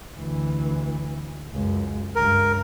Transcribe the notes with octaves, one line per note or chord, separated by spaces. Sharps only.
D2 E3
C#2 F#2
C#2 G2 A#4